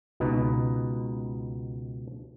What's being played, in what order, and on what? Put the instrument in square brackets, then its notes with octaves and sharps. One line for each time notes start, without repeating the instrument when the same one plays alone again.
[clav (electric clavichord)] C#2 B2 D#4 B4